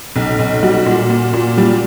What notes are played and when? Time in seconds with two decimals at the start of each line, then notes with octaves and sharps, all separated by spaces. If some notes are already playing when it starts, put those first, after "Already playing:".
0.16 B1
0.39 B1
0.63 G3 F#4
0.86 A#2
1.10 A#2
1.33 A#2
1.57 G3